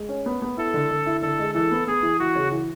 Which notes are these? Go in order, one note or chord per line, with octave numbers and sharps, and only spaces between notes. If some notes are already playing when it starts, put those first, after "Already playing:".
Already playing: G#3
C#4
B3
B3
E4 A4
D3
D3
E4
D3 A4
G#3
E3 A4
B3
B3 G#4
E3
E3 F#4
C#3
E3